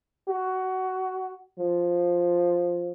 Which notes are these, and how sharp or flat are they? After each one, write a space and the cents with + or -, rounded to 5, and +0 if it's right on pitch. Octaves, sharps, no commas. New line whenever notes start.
F#4 +15
F3 +5